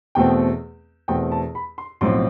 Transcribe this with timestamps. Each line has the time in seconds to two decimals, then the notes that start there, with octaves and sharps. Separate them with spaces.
0.15 E2 B2 A3 C4 G5
1.08 E2 B2 A3 C4 G5
1.32 A5
1.55 B5
1.78 C6
2.01 B1 A2 F3 C4 C6